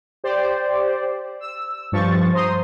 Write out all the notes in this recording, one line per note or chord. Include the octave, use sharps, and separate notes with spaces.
G4 C5 D5
E6
G2 F3 C#6 A6
C5 A#5 C6 D#6